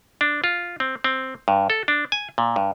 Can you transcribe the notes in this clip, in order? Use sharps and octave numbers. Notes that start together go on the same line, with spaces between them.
D4
F4
C4
C4
G2
A4
D4
G#5
A#2
G2